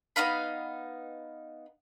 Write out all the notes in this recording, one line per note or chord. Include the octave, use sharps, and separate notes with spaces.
B3 D#4 F5 B5